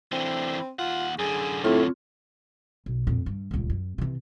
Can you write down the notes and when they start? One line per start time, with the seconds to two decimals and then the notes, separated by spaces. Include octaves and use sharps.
0.12 D3 E3 C4
0.79 D#2 F4 F#5
1.19 F#2 D3 G#4
1.64 A2 C4 F4 C#5
2.86 B1
3.07 F2 A#2
3.26 G2
3.51 D#1 C#2
3.70 F#2
3.98 C3 E3